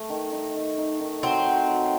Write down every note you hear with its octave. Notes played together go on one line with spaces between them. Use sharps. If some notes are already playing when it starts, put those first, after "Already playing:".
Already playing: A3
D#3
D#4
D#3
D#4
D#3
F#3 C4
F#3
F#3